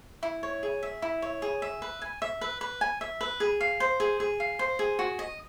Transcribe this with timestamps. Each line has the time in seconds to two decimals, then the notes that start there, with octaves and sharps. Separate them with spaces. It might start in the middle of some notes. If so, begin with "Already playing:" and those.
0.23 E4
0.43 C#5
0.63 G#4
0.83 E5
1.02 E4
1.22 C#5
1.42 G#4
1.62 E5
1.82 B4
2.02 G#5
2.22 E5
2.41 B4
2.61 B4
2.81 G#5
3.01 E5
3.21 B4
3.40 G#4
3.61 F5
3.80 C5
4.00 G#4
4.20 G#4
4.40 F5
4.59 C5
4.79 G#4
4.99 F#4
5.19 D#5